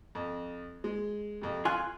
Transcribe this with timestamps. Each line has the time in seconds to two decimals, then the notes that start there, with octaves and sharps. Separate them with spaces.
0.15 F2
0.84 G#3
1.41 F2 C3
1.65 F4 G#5 F#6